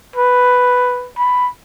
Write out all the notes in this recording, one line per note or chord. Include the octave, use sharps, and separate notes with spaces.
B4
B5